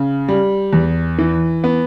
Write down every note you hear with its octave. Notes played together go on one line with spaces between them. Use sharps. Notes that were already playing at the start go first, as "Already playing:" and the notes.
Already playing: C#3
G3
E2
E3
B3